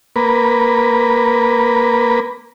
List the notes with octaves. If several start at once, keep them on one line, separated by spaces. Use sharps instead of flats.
A#3 B4